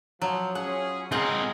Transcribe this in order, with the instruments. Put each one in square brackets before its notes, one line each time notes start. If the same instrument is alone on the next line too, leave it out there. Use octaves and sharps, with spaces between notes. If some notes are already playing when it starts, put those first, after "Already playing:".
[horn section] F3 [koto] F#3
[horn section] C#4 F4 G#4 [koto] F#5
[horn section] G#3 G#4 [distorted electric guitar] C4 A#4 [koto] F4 F#5